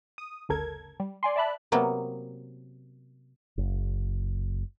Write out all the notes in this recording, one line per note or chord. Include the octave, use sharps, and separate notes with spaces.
D#6
G1 D2 C#3 A4 A#4 G#6
G3
D5 G#5 C6
D5 E5 A5 B5 F#6
C3 F#3 A#3 B3
F#1